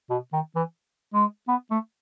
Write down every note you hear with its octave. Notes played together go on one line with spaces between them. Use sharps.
B2
D#3
E3
G#3
B3
A3